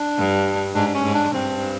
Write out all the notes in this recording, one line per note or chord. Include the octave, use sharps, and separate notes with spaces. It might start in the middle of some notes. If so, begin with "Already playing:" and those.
Already playing: D4
G2
G#2 D4
D4
C#4
G#2
D4
G2 C4